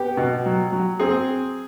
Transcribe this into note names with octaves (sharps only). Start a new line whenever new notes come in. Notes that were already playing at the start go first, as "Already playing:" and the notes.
Already playing: B3 G4
B2
F#3
F#3
C4 G#4